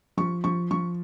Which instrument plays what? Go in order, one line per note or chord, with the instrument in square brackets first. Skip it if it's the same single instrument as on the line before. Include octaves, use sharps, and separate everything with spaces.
[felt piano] F3 C#6
F3 C#6
F3 C#6